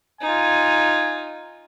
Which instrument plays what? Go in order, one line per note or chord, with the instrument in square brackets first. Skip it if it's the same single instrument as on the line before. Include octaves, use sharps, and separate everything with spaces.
[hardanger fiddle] D#4 F4 [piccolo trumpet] G#5